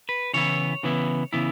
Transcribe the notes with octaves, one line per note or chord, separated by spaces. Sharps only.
B4
C#3 E3 B3 E4 C#5
C#3 E3 B3 E4
C#3 E3 B3 E4